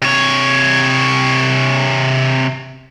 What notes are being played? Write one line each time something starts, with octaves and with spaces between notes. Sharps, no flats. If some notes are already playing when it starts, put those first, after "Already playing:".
C3 C#5